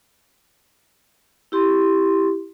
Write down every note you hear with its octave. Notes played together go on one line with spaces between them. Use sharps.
E4 G4 C6